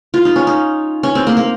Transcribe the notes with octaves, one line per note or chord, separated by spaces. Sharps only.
F4
D#4
C#4
D#4
C#4
C4
A#3
A#3